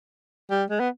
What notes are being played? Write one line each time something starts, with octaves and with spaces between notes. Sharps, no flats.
G3
G#3
B3